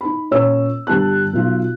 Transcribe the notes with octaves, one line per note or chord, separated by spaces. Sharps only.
D#4 B5
A#2 C#4 C#5 E6
G1 G3 A5 F#6
B1 F4